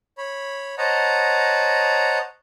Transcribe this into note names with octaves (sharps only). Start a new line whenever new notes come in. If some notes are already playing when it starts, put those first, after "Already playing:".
C#5 B5
C5 C#5 D#5 F#5 A5 A#5